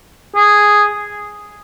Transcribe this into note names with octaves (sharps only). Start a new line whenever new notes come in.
G#4